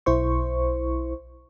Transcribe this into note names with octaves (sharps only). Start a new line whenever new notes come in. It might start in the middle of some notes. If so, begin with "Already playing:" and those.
B1 E4 C5 C#6